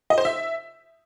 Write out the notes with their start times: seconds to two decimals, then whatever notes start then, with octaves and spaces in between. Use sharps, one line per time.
0.10 D#5
0.18 C5
0.25 E5